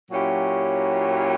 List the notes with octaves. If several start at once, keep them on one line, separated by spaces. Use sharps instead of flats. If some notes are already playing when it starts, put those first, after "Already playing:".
A#2 F#3 C#4 E4 G4